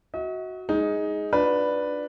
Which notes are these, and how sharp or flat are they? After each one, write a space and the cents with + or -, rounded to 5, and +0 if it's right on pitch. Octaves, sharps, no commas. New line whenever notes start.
F#4 +0 D#5 +45
G#3 +0 D#4 +10
D4 +0 F4 +35 B4 +0